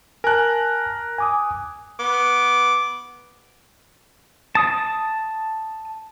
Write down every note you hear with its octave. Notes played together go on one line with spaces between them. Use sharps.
A#4 G#5 A5 F#6
G#5 D6 D#6
B3 D6
A5 D#6